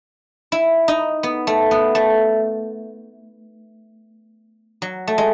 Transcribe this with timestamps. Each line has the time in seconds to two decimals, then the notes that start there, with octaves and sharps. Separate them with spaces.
0.52 E4
0.88 D#4
1.23 B3
1.47 A3
1.71 B3
1.95 A3
4.82 F#3
5.07 A3
5.18 G#3